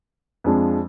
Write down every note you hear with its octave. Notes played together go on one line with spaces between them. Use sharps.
F2 F3 G#3 D4